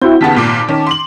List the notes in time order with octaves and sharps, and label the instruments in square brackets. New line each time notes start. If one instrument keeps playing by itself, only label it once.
[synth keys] C4 E4 F#4 [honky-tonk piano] G6
[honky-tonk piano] D#2 C#3 B3 [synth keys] A5 B6
[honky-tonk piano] G#1 A#2 D6
D#3 C#4
C6 D6 F#7